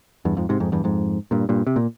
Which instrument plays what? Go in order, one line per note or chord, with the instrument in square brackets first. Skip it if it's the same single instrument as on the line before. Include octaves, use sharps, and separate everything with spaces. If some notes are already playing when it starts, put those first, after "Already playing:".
[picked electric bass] E2 G2
F2 G#2
G#2 C3
F2 G#2
E2 G2
F2 G#2
G2 A#2
G2 A#2
C3
A#2